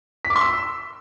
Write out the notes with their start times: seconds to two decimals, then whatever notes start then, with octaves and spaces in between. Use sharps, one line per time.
0.25 B6
0.30 D6
0.36 C6
0.41 E6